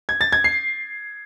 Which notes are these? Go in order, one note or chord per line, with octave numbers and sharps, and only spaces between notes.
G#6
A6
G#6
C7